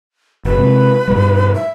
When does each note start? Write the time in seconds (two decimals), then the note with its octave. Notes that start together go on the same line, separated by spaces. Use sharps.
0.45 F#1 B4
0.58 C3 G#3
1.08 G2 B2 G3
1.55 E5